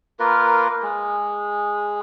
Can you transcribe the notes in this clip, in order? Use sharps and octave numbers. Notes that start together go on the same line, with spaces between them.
A#3 F4 A#4 B4
G#3